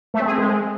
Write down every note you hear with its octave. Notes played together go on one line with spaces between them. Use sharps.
A3
C4
G#4
C4
G#3